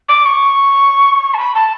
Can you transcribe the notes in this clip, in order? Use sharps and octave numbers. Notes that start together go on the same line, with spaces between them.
D6
C#6
A5
B5
A5